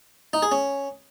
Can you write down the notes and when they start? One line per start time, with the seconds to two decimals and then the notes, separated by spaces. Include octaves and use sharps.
0.33 D#4
0.42 G#4
0.52 C#4